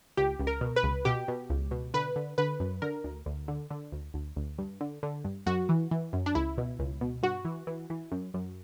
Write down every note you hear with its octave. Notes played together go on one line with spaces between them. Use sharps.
C#2 G4
C#2
A#4
B2
B4
C#2
B2 G4
B2
C#2
B2
D3 B4
D3
D3 B4
F#2
D3 A#4
D2
D2
D3
D3
D2
D2
D2
G2
D3
D3
G2
F#2 F#4
E3
E3
F#2
D4
C#2 E4
B2
C#2
B2
G2 F#4
E3
E3
E3
F#2
F#2